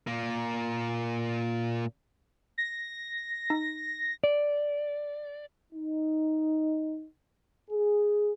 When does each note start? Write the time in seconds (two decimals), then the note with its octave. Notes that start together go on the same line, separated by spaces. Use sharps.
0.07 A#2 A#3
2.58 A#6
3.50 D#4
4.24 D5
5.73 D#4
7.71 G#4